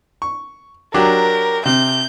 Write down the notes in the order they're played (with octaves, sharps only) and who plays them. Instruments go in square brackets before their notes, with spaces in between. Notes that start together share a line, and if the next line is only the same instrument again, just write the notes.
[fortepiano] C#6
[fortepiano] F#3 D4 G4 [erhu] A#4
[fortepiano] C3 [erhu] G6